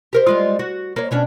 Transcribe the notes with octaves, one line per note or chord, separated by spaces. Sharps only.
G4 A#4 C5
G3 G#3 F4
F#4
A#3 C#5
B2 C#4 D4